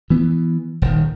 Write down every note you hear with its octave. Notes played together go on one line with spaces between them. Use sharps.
E3 B3
D#1 D#3